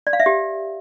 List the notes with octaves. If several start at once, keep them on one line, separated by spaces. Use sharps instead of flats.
D5
F5
E5
G4